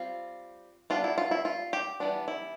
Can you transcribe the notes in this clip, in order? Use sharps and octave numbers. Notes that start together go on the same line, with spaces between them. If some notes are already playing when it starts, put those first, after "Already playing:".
Already playing: G3 C4 F4
G3 B3 D4 F4
E4
F4
E4
F4
G4
E3 G3 B3 D4
E4